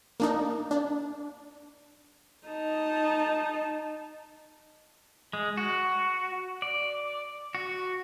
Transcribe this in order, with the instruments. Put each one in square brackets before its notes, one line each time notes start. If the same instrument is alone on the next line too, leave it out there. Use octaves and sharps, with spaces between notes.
[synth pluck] A#3 D4 D#4
D4
[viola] D#4 A5
[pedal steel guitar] G#3
F#4
D5
F#4